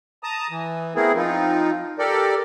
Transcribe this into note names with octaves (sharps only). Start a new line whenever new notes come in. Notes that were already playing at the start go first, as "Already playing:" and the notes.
A5 A#5 D#6
E3
A3 B3 C4 E4 G#4 A#4
F3 C4 D#4 F4
G4 A4 A#4 D5